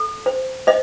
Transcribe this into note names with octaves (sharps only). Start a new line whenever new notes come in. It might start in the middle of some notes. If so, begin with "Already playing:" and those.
Already playing: A4
C5
C5 D#5